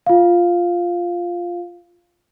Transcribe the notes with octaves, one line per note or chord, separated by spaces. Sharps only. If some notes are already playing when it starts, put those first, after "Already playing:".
F4 F5